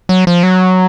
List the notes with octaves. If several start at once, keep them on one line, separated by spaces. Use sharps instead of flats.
F#3
F3
F#3